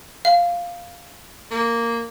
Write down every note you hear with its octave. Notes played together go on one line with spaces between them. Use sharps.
F5
A#3